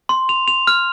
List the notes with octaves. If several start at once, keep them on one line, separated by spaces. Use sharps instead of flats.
C6
F7
F7
F6